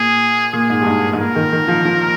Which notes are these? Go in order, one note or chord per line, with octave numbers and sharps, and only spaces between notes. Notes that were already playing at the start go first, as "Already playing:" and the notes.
Already playing: A#2 G#4
A#2 G#4
G#2
G2
G#2
G#2
A#2 A#4
D#3
D#3
F3
F3